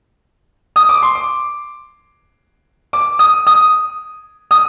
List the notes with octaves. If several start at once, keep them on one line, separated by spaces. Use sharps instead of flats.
D#6
D6
C6
D6
D6
D#6
D#6
D#6